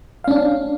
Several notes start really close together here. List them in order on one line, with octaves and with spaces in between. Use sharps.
F5 C#4 D4